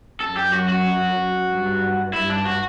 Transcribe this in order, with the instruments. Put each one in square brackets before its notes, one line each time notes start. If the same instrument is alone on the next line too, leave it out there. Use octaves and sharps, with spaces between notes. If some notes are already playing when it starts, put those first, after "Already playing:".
[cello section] F#2 [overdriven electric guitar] A4
[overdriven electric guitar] G4
F#4
F#4
[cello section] G2
[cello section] G2 [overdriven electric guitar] E4
[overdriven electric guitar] D4
F#4